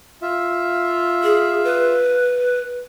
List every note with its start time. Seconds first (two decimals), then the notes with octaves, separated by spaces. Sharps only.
0.22 F4 E5
1.24 G#4
1.64 B4